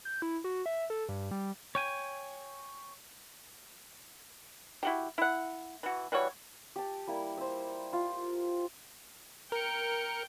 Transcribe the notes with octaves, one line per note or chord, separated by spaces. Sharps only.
G6
E4
F#4
E5
A4
G2
G3
C#5 G5 G#5
E4 F#4 G4
E4 F#5
E3 F#4
E3 G3 F#4 C#5
G4 A5
G3 A#3 E4
C5 E5
F4
A#4 G5 C#7